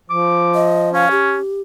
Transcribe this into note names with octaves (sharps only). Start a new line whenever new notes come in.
F3 D6
D#5
C#4 F5
G4